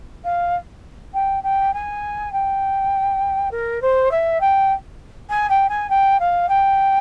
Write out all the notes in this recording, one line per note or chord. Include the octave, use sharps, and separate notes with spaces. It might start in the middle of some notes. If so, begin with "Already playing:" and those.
F5
G5
G5
G#5
G5
A#4
C5
E5
G5
G#5
G5
G#5
G5
F5
G5